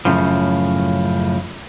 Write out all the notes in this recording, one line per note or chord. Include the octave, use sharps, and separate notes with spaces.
F#2 A2 C#3 F3